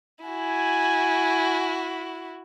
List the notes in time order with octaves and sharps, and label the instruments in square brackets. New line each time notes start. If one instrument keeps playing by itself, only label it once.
[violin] E4 F#4 [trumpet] G#5